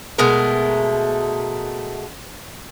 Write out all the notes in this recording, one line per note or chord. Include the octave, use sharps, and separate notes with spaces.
B2 G#3 A3 A#4